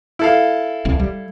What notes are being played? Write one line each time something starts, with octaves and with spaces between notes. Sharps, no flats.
E4 A4 F5
D#1 C2
G3